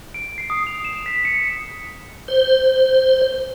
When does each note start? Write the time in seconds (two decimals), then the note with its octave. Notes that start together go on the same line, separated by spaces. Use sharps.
0.14 D7
0.38 C7
0.50 D#6
0.67 F7
0.85 E7
1.06 B6
1.25 C#7
2.28 C5